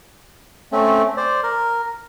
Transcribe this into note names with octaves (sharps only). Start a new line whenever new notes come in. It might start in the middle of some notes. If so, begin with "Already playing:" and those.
A3 C4 C#4
C5 D5
A#4